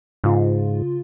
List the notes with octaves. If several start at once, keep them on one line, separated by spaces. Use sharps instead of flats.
G#2 C#3 F4